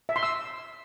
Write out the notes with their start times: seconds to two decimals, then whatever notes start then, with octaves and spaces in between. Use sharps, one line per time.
0.09 E5
0.16 C6
0.23 E6